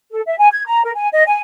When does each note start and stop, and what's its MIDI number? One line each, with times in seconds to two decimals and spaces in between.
0.11 0.21 69
0.26 0.36 76
0.38 0.49 80
0.52 0.65 92
0.66 0.82 82
0.84 0.91 70
0.95 1.08 80
1.13 1.24 75
1.27 1.41 80